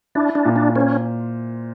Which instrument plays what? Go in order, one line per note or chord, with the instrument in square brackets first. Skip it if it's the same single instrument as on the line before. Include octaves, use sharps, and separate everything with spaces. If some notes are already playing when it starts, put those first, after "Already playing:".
[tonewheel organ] D4 [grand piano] E4
[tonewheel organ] D4
[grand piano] A#2
[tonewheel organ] D4
[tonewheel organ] C#4 [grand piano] C5